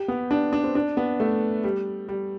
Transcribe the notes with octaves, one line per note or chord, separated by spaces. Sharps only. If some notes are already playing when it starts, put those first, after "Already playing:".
Already playing: G4
B3
D4
D4
C4
D4
B3
A3
G3
G3